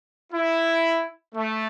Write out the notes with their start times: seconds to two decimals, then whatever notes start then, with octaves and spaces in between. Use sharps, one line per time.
0.33 E4
1.35 A3